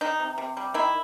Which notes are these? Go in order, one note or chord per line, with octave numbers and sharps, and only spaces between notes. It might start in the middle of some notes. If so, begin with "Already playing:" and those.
D#3 D#4
C3
C3
G3
D#3 E4